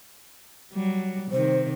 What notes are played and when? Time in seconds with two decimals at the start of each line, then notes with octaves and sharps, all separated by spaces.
0.73 F#3 G3
1.31 C3 D#3 C5